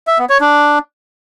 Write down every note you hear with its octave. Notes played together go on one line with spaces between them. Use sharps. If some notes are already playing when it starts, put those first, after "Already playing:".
E5
B3
C#5
D4